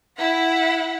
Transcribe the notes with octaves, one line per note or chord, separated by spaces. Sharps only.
E4 F#5